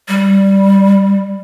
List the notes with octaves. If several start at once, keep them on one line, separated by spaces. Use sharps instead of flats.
G3